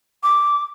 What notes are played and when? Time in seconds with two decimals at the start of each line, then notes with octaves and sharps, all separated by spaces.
0.23 D6